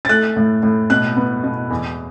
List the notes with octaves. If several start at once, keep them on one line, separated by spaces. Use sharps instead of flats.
A6
A3 F#6
A2
A2
B2 F#6
B3
B2
E2